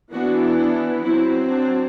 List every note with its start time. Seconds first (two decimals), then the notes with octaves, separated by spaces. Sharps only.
0.12 E3 B3 D4 F#4
0.58 D4
1.05 F#3 C4 E4
1.51 D4